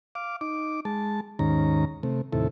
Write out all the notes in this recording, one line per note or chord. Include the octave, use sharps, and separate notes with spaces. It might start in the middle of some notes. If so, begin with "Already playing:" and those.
F5 D6
D#4 D6
G#3 A5
D#2 G#2 D#3 C#4 A#5
C3 A3
D#2 A2 C3 E4 A4